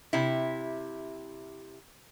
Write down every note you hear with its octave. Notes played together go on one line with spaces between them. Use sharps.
C3 E4